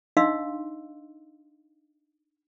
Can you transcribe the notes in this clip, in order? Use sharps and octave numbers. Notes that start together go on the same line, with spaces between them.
D4 D#4 D#5 F5 C6 E6